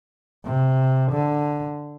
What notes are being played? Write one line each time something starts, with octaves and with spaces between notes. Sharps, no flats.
C3
D3